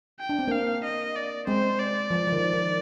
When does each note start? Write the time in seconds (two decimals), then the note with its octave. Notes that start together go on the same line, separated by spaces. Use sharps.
0.20 G5
0.29 D4
0.39 C4
0.48 A#3 D4 F5
0.84 D#5
1.16 D5
1.47 G#3 C4 C5
1.79 D5
2.11 F3
2.27 F3
2.32 D#3
2.53 D#3